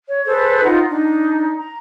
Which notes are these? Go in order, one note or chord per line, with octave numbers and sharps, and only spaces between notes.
C#5
G#4 A4 B4 C5
D#4 F4 F#5
D4 D#4
A#5